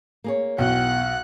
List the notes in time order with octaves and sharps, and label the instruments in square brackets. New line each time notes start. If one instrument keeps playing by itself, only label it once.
[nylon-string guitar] A#3 G#4 C#5
[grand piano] B1 [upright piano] E2 B2 [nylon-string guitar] D#5 G5 [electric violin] F#5 F#6